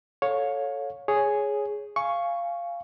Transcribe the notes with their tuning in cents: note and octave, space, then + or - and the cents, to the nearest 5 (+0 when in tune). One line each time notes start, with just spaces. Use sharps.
A4 +0 C#5 +0 F5 +30
G#4 +0 C#5 +0
F5 -10 G#5 +10 C#6 +0